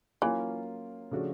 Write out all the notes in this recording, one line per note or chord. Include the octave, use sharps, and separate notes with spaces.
E3 F#3 A#3 C#4 F4
C#3 F3 A3 D4 F#4